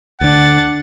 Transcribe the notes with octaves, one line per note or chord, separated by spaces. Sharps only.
D2 D3 D4 F#5 A6